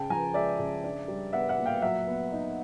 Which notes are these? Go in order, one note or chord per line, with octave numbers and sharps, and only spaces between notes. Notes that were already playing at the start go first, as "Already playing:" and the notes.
Already playing: C#3 G5 A5
F3 G#5 A#5
G#3 D5 E5
C#3
D4
G3
B3 E5 F#5
E5 F#5
A#2
F5 G5
F#3 E5 F#5
B3
D#4